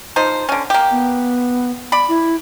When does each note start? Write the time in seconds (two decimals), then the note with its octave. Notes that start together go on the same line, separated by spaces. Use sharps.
0.16 F3 D#4 C5
0.49 D3 C#4
0.70 A#3 G4
0.91 B3
1.92 D5 B5
2.09 E4